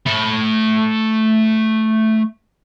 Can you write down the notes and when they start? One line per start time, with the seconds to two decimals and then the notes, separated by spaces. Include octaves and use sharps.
0.06 A3 B5